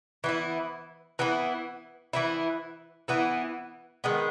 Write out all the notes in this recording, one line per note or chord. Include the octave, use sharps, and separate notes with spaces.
E3 B3 E4
E3 B3 E4
E3 B3 E4
E3 B3 E4
D#3 G#3 B3